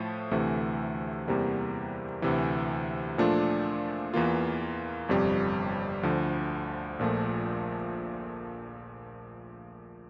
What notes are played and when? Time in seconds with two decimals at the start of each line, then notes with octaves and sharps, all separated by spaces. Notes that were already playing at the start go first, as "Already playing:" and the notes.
Already playing: A2 F3 A3
0.31 D2 C3 E3 A3
1.28 E2 C3 G3 A#3
2.22 D2 C3 E3
3.18 A#2 F3 A3 D4 F4
4.14 E2 E3 A#3 F4
5.09 G1 F2 C3 G3
6.03 D2 D3 F3
6.99 A#1 A#2 F3 A3